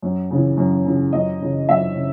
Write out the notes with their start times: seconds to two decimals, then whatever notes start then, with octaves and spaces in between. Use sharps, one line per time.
0.02 F#2
0.31 C#3 E3
0.57 F#2
0.85 C#3 E3
1.13 F#2 D#5
1.41 C#3 E3
1.69 F#2 E5
1.95 C#3